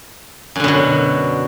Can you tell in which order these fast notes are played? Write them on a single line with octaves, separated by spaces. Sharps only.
F#2 D3 B2 F#3